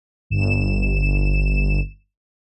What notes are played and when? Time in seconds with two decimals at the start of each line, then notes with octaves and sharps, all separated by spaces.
0.30 G1 E7